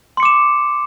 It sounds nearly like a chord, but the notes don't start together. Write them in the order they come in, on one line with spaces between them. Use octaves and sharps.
C6 C#7 D6 E7